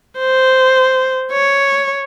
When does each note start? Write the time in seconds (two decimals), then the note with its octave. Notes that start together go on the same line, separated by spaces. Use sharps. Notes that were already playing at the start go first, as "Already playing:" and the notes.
0.18 C5
1.32 C#5